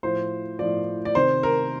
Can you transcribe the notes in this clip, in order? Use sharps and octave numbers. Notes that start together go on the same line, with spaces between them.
A2 F3 C5
A2 F3 D5
D5
C3 D#3 C5
A#4